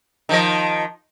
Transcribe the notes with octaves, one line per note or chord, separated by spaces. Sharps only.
D#3 F3 D#5